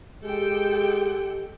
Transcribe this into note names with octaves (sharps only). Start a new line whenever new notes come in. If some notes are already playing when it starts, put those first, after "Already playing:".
G#3 G4 A4 G5